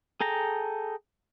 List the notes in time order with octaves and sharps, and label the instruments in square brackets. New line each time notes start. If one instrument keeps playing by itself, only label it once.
[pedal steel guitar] G#4 A4 G5 A#5